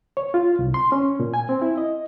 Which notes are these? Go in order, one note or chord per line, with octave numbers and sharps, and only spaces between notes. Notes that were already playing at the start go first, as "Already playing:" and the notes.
C#5
F4
C2
C6
C#4
A#2
G#5
C4
E4
D#5